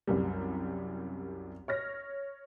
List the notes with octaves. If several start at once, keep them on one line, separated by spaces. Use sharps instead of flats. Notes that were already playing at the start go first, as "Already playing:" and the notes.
C2 F#2 G3
C#5 F6 A#6